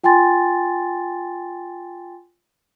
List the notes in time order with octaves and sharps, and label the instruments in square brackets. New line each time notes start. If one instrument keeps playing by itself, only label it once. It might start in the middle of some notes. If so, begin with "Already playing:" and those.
[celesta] F4 G5 G#5 C6 A6